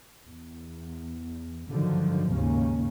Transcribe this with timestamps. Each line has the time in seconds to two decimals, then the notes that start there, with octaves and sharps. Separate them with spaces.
0.27 E2
1.70 G2 D3 D#3 F3 F#3
2.32 G#1 D#2 C#3 A#3 C#4